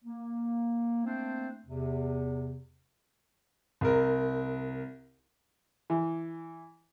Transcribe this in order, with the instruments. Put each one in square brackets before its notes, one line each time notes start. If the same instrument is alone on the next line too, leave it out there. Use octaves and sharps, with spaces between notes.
[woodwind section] A#3
A3 A#3 C4 D4 C5
E2 C3
[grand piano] C2 A#4
[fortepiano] E3